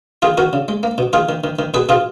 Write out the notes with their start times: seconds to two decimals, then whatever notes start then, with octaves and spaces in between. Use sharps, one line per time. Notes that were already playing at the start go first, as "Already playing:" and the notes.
0.22 D#3 F4 G#4
0.37 D#3 F#4 A#4
0.53 C#3
0.68 G#3
0.83 A#3
0.98 B2
1.13 D#3 F4 G#4
1.29 D#3
1.44 D#3
1.59 D#3
1.74 B2 G#4 B4
1.89 B2 F4 G#4